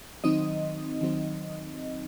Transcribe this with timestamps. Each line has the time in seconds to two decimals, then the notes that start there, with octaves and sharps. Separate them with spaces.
0.24 D#3 F#3 C4 D#4 D#5
1.01 D#3 F#3 C4 D#4